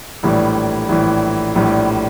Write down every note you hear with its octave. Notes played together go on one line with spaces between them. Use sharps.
A#1 A2 E3 G3
A#1 A2 E3 G3
A#1 A2 E3 G3